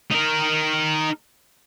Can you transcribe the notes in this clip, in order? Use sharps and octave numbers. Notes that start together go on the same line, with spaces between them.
D#4 A#4